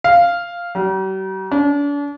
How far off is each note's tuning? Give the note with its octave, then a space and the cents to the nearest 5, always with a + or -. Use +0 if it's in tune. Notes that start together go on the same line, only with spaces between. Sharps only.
F5 -5
G3 -45
D4 -40